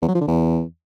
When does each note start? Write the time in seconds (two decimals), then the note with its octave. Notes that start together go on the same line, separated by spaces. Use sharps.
0.02 E2
0.08 F#3
0.15 F3
0.21 D3
0.27 E2